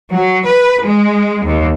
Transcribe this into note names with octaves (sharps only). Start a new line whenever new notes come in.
F#3
B4
G#3
D#2